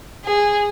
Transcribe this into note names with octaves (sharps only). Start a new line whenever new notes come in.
G#4